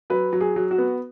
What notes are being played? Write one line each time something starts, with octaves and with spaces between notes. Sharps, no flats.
F#3 B4
F#3
G#4
F#3
F#4
B3